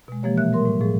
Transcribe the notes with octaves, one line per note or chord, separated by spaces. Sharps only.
B2 G#3
E3 F3 G#3 A#3 G4 C#5
A#2 A#3 E5 F#6
G3 A#4 C6
A2
A2 F3 G#4